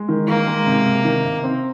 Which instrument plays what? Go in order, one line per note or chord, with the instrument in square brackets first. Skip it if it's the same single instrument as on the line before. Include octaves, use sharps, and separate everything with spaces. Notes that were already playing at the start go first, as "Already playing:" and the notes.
Already playing: [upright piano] G#3
D#3
[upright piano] D#3 [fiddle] A#3
[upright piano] G#3
C3
C3
D#3
C3
C4